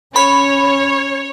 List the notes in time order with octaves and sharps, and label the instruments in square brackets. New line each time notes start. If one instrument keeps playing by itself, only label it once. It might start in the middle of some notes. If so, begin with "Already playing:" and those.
[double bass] C#4 [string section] C#5 [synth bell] B5